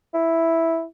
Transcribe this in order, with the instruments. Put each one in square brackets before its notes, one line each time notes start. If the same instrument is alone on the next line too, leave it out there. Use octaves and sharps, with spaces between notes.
[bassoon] E4